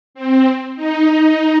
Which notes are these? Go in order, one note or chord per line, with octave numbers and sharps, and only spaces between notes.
C4
D#4